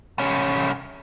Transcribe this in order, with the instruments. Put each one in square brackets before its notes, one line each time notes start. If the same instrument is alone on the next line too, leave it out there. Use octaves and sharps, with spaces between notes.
[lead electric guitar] C2 C#4